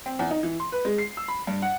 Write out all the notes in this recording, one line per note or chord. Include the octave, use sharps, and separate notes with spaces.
C4
E2
D#4
E3
C6
B4
G#3
C7
E6
B5
G2
F#5